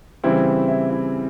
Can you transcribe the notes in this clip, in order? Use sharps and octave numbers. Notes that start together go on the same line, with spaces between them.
C#3 E3 G3 C4 E4
E4
E4